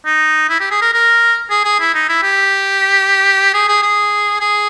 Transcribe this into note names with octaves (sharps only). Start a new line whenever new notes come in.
D#4
E4
G4
G#4
A#4
A#4
G#4
G#4
E4
D#4
E4
G4
G#4
G#4
G#4
G#4